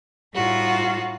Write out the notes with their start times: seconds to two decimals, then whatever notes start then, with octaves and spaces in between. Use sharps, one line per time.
0.35 A2 G3 D#4 F4 F#4